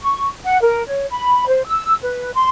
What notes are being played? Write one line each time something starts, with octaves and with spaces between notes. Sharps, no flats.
C#6
F#5
A#4
C#5
B5
C5
E6
B4
C6